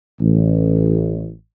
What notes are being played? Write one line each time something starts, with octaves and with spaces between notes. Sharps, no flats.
A1